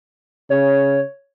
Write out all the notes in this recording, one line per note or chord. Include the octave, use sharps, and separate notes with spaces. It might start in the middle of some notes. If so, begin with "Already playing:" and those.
C#3 C#5